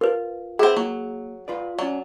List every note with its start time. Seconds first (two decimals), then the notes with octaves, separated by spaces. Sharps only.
0.01 F4 A#4 B4
0.59 C4 E4 G#4 B4 F#5
0.77 F#3 A#3
1.48 F4 B4 D5
1.79 F#3 C#4 D5